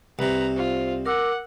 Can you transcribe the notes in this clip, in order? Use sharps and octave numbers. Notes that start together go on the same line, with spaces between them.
C2 C3 B4 A#5
F4 C5
A#4 F#5 D6 E6